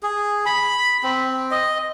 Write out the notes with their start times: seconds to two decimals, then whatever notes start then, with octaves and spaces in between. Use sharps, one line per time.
0.03 G#4
0.46 B5
1.03 C4
1.51 D#5